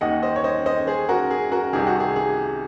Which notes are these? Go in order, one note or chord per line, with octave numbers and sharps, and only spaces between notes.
D#2 D#3 D#5 F#5
C5 D#5
C#5
C5 D#5
C5 D#5
G#4 C5
F#4 A#4
G#4
F#4 A#4
C2 C3 D#3 G#4
F#4
G#4
G#4